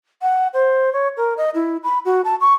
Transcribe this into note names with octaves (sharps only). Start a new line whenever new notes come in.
F#5
C5
C#5
A#4
D#5
E4
B5
F#4
A5
C#6